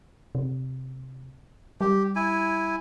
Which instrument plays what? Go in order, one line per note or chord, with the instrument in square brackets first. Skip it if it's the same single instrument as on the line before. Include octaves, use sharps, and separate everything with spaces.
[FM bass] C3
[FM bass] G3 [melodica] G4
[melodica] E4 G#5